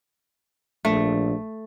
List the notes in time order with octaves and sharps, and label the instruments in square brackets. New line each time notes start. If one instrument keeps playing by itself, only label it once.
[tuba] A#1 [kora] A3